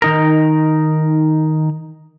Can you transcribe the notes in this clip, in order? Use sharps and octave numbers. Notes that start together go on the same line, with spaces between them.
D#3 D#4 A#4